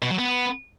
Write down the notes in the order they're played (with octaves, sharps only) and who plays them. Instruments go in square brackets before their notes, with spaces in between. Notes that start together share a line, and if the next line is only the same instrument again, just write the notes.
[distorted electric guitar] B2
F#3
B3